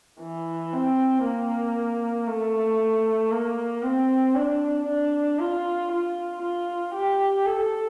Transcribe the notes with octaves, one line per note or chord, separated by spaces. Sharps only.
E3
C4
A#3
A3
A#3
C4
D4
D4
F4
F4
F4
G4
A4